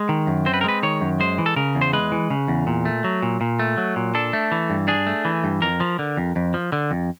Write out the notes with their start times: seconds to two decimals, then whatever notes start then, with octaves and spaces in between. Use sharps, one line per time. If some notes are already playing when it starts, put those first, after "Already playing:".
Already playing: G#3
0.09 D#3
0.27 F#2
0.46 C4 C5
0.54 B4
0.61 A#4
0.64 G#3 B4
0.83 D#3 C#5
1.01 F#2
1.20 G#3 C5
1.38 E3
1.46 A4
1.56 C#3 A#4
1.75 E2
1.81 C5
1.93 G#3 B4
2.12 E3
2.30 C#3
2.48 E2
2.67 A#2
2.85 A3
3.04 F#3
3.22 A#2
3.41 A#2
3.59 A3
3.77 F#3
3.96 A#2
4.15 D4 A4
4.33 A3
4.52 E3
4.70 G2
4.88 D4 G#4
5.07 A3
5.25 E3
5.44 G2
5.62 F2 A#4
5.80 F3
5.99 D3
6.17 F2
6.36 F2
6.54 F3
6.72 D3
6.91 F2